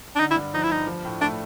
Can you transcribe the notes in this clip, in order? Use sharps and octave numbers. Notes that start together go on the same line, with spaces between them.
D4
D3 D#4
E4
G2
F3 D#4
E4
G2 D#4
F3
A2
A3 D4